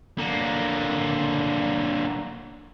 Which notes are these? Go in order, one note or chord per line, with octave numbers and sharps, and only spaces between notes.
D3 A#3